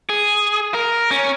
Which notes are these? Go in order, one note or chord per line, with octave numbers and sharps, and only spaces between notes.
G#4
A#4
C#4